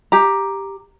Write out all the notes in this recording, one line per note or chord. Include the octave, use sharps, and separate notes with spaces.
G4 A#5